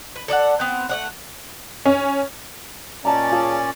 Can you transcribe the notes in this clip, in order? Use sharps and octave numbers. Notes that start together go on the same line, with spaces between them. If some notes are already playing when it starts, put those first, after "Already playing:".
B4
A4 D5 D#5 F#5
B3 C4
A3 D5 F#5
C#4
A#2 C#4 D5 D#5 A5 A#5
F4 G#4 A5